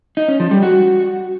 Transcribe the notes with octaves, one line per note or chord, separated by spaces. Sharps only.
D#4
C#4
F3
G3
F#4